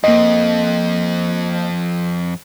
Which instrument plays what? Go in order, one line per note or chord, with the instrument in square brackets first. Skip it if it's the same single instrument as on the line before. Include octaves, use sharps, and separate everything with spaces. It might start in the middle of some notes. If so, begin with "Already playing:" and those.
[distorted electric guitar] F2 [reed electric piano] A#3 D#5